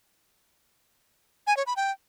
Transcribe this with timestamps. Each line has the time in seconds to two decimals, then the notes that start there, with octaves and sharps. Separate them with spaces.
1.47 G#5
1.57 C#5
1.67 B5
1.77 G5